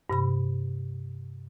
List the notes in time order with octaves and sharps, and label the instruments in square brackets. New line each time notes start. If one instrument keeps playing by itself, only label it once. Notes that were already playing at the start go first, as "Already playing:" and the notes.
[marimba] G2 C3 B5